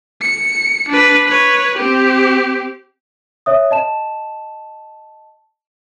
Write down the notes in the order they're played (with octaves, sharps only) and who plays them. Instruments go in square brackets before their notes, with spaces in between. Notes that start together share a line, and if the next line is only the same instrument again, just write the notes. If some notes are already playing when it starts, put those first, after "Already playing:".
[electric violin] C#7
D4 B4
B4 C#5
C4 G4
[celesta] C#5 E5 D#6
D#5 A5 E7